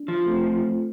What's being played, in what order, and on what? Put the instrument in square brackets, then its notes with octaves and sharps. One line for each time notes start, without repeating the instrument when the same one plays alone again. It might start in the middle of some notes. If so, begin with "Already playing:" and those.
Already playing: [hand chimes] D4
[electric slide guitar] F3
[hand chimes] A3 C4 F4 A4 C5